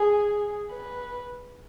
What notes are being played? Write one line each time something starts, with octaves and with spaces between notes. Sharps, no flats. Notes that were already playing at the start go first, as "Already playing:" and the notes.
Already playing: G#4
B4